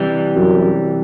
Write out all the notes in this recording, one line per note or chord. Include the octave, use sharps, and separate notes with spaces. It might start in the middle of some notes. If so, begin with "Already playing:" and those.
Already playing: C3 E3 G3
F#2